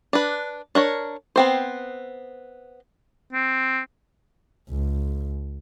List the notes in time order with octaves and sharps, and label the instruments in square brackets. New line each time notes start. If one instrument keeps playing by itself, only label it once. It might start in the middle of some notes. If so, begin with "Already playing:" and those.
[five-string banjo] D4 B4
D4 A#4 C#5
B3 C4 C5
[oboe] C4
[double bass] C#2